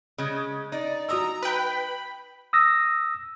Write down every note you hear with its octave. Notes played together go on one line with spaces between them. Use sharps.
C#3 G#3
D#4 D5
F#4 A#5 D#6 E6
B4 G5 B5
D#6 E6 A#6